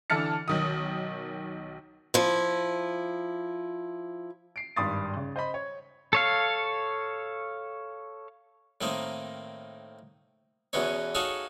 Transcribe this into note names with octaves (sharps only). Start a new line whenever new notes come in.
D3 E3 A5 F6 A6 C#7
B1 D#3 D#6
F3 E4
C7 D7
G#1 G2 B5 C6 D#6 A6
C#3
C5 D#5 B5
C#5
A4 C#5 F5
A2 D#3 A#3 C4 D#4
E2 B2 E3 C#4 D#4 C#5
D#4 F#4 G#4 A4 C#5 F5